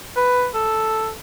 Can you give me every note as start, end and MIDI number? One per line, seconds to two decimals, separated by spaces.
0.17 0.48 71
0.55 1.11 69